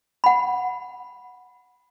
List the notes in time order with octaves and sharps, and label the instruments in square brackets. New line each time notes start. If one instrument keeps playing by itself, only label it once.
[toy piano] F#5 B5